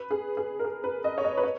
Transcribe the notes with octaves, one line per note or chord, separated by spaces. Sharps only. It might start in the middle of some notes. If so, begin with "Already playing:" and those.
Already playing: B4
G#4
G#4
A#4
G#4
B4
D#5
C#5
D#5
B4
C#5